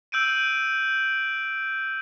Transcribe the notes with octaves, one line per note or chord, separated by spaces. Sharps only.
E6 G6 D7 D#7